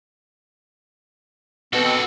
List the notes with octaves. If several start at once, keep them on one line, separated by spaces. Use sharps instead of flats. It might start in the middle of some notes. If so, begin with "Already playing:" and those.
B2 C4 F#4 A4